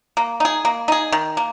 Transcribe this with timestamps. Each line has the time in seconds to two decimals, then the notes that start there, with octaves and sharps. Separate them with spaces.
0.17 A#3
0.40 D#4 G#4
0.65 A#3
0.88 D#4 G#4
1.12 D#3
1.37 A#3